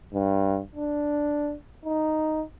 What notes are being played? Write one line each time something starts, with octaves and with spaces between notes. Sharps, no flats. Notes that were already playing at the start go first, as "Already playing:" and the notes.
G2
D4
D#4